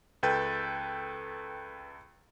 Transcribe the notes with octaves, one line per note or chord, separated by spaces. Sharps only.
C#2 A4 B4 G5 G6 A6